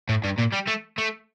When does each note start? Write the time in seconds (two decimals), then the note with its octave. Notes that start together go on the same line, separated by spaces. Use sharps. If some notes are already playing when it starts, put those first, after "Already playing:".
0.09 A2
0.24 G2
0.39 A#2
0.53 G3
0.68 A3
0.98 A3